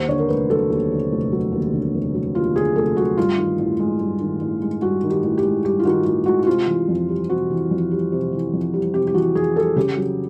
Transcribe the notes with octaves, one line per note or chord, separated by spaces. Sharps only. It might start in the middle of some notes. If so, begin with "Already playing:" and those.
Already playing: D#2 C5
D3 C#5
A#4
F1 B4
F#3 A4
D#2
D3
F1
F#3
D#2
D3
F1
F#3
D#2 F4
D3 G#4
F1 A4
F#3 F#4
G2 F4
D#3
A1
G#3
G2
D#3
A1
G#3
G2 F#4
D#3
G4
A1
G4
G#3
G2 G4
F4
D#3 F#4
A1 F#4
G#3 F#4
F#4
C3 F4
E3
F2
G3
C3 F#4
E3
F2
G3
C3
E3
F2
G3
C3 G4
G4
E3 F#4
F2 G#4
G3 A4
C#3 G4
F#3